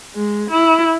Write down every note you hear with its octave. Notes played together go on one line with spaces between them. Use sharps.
G#3
E4